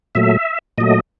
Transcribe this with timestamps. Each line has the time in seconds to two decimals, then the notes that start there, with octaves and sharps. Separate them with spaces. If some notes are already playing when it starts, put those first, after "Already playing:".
0.15 A#2 F#3 A3 E5
0.78 A#2 F#3 A3 D#5